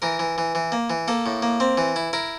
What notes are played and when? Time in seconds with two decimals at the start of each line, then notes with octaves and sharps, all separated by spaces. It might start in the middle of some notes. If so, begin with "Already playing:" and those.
0.02 E3 A#4
0.19 E3
0.38 E3
0.55 E3
0.72 A#3
0.90 E3
1.08 A#3 A4
1.26 A2
1.42 A#3
1.60 C4
1.78 E3
1.96 E4
2.13 E4 A#4